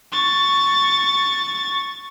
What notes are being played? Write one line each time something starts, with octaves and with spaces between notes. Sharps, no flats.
C#6 A6